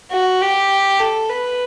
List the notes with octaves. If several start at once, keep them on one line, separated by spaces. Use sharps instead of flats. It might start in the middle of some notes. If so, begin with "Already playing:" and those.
F#4
G4
A4
B4